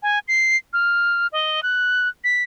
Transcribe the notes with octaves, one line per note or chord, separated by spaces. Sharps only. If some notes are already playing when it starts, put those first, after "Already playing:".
G#5
C7
F6
D#5
F#6
B6